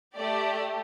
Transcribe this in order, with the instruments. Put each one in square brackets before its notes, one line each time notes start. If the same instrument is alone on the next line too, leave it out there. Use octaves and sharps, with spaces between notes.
[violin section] A3 G4 D5